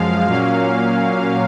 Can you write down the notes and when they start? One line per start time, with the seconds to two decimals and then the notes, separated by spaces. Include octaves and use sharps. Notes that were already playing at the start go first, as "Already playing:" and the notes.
Already playing: F#2 F3 G#3 F5
0.27 A#2 F#3 A#3 C#4 F5